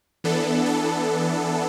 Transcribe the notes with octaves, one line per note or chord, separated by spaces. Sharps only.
E3 B3 D4 A4
A4